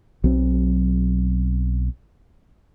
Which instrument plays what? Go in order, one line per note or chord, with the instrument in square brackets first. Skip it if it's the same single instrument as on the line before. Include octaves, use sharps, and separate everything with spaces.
[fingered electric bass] B1 F#3 C4